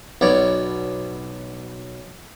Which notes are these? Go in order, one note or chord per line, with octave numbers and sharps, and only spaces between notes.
B1 B2 C#5 D5